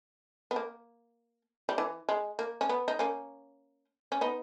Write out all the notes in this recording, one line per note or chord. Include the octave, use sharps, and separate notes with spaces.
B3
A#3
G3
E3
G#3
A#3
C#4
B3
D#4
A#3 C#4
C#4
B3 D#4